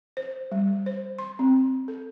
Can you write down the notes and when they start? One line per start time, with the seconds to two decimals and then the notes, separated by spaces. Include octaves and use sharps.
0.17 C5
0.52 G3
0.86 C5
1.19 C6
1.39 C4
1.88 A4